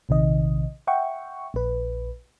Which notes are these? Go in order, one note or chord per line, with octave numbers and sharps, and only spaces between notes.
A#1 C3 D#3 D#5
E5 F#5 G5 C#6
A#1 B4